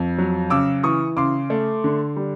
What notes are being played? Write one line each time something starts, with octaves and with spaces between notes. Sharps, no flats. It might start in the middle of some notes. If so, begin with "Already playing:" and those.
Already playing: F2
F#3
C#3 D6 E6
E3 C#6 D#6
C#3 C6 D6
A3
D3
G3